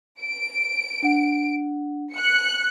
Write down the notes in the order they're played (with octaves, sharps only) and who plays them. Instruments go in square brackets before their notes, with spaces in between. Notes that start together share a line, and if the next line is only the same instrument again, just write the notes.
[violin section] D7
[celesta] D4 F#5
[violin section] F#6 C#7